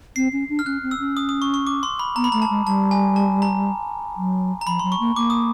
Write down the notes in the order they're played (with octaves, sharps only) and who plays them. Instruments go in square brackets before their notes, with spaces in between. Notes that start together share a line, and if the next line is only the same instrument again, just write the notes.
[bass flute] C4 [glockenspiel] C7
[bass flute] C#4
D4
[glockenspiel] F6
[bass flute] C#4 [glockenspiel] F#6
[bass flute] C4
[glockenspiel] E6
[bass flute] C#4
[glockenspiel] D#6
D#6
C#6
C#6
D6
C6
B5
[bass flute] B3 [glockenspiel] A#5
[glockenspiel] B5
[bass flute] A3 [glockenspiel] A#5
[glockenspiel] A5
[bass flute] G#3
[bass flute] G3 [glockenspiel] A5
[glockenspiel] G#5
A5
A#5
[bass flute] F#3
[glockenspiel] A#5
[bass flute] F3 [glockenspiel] B5
[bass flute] F#3 [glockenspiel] C6
[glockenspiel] C#6
[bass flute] A#3
[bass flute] A#3 [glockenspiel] D6
[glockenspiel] D#6